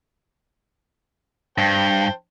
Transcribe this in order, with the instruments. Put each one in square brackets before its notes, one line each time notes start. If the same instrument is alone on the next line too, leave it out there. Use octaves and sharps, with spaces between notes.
[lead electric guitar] G2 [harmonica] C5 G5 A5